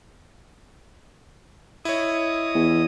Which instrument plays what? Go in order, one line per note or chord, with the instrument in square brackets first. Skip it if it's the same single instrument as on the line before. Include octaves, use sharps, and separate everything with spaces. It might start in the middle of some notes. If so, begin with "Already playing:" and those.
[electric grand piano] E4 C#5 [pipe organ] D#5 D#6
[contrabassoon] E2